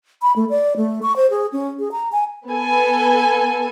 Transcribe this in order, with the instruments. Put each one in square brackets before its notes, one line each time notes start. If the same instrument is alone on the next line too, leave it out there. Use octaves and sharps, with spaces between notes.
[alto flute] B5
A3
D5
A3
C#6
C5
G#4
C#4
G#4
A#5
G#5
[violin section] B3 A4 G#5